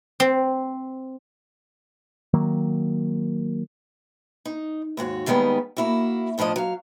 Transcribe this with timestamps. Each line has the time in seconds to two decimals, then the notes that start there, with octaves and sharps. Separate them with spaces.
0.20 C4
2.34 D#3 F#3 A#3
4.45 D#4
4.97 D#2 G#2 F#4 C#5
5.26 D#2 D#3 G3 G#3 B3
5.77 A#3 E4 F#4
6.38 D#2 A2 F3 D4 D#5
6.56 F#3 F5